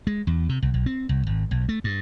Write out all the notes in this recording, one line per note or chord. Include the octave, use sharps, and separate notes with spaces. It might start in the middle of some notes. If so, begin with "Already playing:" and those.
G#3
E2
C3
C2
B1
C4
C2
G#1
B1
A3
G2